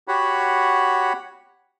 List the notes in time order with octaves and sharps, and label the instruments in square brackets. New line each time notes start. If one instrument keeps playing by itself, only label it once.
[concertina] F#4 G4 C#5 F#5 B5